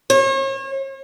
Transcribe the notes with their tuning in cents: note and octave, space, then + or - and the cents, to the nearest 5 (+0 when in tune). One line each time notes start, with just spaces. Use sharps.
C#5 -40